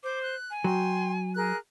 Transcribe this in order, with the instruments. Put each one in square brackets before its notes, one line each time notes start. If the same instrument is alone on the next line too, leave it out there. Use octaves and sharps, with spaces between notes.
[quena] C5 [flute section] D6
[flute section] F#6
[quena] G#5
[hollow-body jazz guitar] F#3 [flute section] G5 C6
[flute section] G#4 A#4 F#6